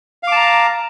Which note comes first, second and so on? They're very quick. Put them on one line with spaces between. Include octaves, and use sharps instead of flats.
F5 D6 A5 A#5